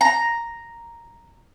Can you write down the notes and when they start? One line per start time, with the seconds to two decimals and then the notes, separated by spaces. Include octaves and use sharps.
0.01 A#5